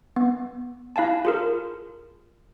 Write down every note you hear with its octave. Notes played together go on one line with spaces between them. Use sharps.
B3
E4 F5 G#5 A5
F4 G#4 A#4